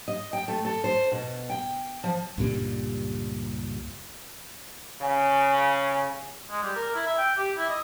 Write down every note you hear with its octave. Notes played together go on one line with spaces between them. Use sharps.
D#5
G5
A3
A4
C5
B2
G5
F3
C#2 G2 A#2 G3
C#3 G#5
G#3
G3
A#4
E4
E5
G5
G4
E4
D#5